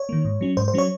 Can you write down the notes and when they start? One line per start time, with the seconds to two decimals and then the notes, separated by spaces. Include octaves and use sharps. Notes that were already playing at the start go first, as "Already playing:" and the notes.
Already playing: C#5
0.09 D#3 A#3
0.25 G#2
0.41 F#3 C#4
0.57 G#2 C5
0.68 C5
0.74 F#3 C#4 C#5